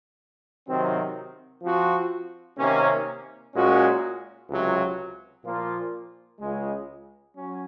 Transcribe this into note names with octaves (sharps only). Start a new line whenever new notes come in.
C3 D#3 F#3 C4
F3 C4 F#4
C3 D#3 A#3 C#4
A#2 G#3 C#4 F#4
C#2 C3 F#3
A#2 F3 A#3 F4
C#2 C#3 G#3
F#3 C#4